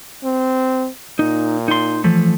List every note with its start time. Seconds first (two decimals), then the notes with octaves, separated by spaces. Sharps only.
0.23 C4
1.19 A#2 D#4
1.68 D#4 C6
2.04 E3 F3 A3